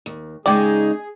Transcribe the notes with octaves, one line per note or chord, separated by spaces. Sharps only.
D#2
C#3 G#3 D#4 G#4 D5 G5